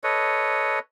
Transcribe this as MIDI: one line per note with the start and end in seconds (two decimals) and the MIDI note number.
0.04 0.79 69
0.04 0.79 71
0.04 0.79 73
0.04 0.79 75